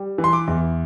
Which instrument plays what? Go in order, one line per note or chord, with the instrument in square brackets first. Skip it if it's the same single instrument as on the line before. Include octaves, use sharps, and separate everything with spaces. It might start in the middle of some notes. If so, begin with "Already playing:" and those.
Already playing: [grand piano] G3
E3
C6
D6
E2